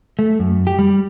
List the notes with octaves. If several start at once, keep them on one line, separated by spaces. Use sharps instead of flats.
A3
F#2
G4
G3